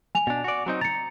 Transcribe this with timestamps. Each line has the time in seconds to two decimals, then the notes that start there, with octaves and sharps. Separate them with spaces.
0.15 G#5 F7
0.27 B2 D4
0.44 F#4 D5
0.66 F#3 C4 D#4
0.81 A#5 A6 C#7